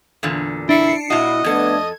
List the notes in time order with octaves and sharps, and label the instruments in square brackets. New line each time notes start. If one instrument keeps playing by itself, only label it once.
[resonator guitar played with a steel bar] E2 A#2 D3
[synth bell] D4 C7 C#7 [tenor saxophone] E4
[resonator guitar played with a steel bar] A#2 F#4 [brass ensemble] E4 [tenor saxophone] D#5
[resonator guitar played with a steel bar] F2 A4 [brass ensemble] A3 B3 D4 [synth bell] G#6